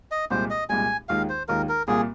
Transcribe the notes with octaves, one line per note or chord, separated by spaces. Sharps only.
D#5
C2 A#2 G#3 C5
D#5
C2 A#2 G#3 G#5
D#2 D#3 G#3 F4 F5
C5
D#2 D#3 G#3 F4 A#4
A#4
C2 A#2 A#3 G#4